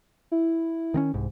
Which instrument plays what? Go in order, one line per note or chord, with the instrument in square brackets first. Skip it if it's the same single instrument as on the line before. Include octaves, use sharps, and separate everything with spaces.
[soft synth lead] E4
[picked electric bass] D#3 C4 C#4
C2 G#2